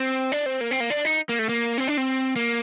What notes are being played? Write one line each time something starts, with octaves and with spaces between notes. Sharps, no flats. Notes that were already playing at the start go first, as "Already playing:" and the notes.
Already playing: C4
D4
C4
A#3
C4
A#3
D4
D#4
A#3
A3
A#3
C4
D4
C4
A#3